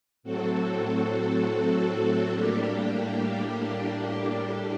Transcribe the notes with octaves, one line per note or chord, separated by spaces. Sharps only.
A2 F#3 C4 F#4 A4
A2 G3 A#3 D4 G4
A2 G3 D4 G4